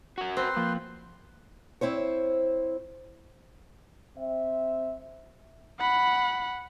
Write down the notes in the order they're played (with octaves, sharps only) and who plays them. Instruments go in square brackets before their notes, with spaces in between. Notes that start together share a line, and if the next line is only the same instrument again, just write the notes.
[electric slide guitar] F#4 A#4
[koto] C4 [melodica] B4 C6
[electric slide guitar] F3 [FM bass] A#3
[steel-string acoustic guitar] C4 E4 C5 C#5
[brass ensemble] C4 E5
[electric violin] F#5 B5